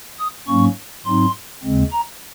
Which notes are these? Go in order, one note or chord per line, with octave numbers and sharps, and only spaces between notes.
D#6
G#2 F#3 A#3 C#4 C#6
G#2 F#3 C4 D#4 C6
D#2 C#3 G#3 C4
A#5